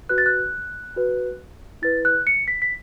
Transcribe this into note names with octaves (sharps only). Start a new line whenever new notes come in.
F#4 B4 F#6
A6
F#6
F#4 B4
E4 B4 A6
F#6
C#7
B6
B6